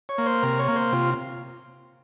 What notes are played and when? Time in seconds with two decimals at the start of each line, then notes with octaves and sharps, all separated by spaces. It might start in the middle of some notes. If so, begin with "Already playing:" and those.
0.09 C#5
0.18 A#3
0.26 C5
0.43 C3 A#4
0.59 C#5
0.68 A#3
0.76 C5
0.92 C3 F4